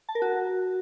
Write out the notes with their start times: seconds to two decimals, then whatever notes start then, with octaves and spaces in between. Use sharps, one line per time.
0.09 A5
0.15 A#4
0.22 F#4